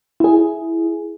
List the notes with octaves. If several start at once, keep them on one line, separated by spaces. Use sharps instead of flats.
E4 G#4